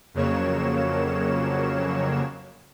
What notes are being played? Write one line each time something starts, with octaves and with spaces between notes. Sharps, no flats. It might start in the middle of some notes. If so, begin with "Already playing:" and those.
F2 C#3 F#3 A#3 C#5 E7